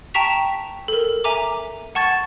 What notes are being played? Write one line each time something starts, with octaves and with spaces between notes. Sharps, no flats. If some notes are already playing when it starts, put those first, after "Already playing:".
G5 A5 A#5 C#6 B6 F7
A4 A#4
E5 G#5 A#5 D6
F#5 A5 C#6 G#6 A6